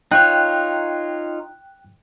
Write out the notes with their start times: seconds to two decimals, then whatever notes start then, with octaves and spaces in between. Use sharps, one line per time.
0.11 D#4 F4 C#5 G5 F#6